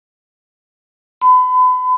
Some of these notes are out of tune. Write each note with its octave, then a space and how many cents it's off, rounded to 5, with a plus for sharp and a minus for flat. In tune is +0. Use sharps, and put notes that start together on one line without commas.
B5 +35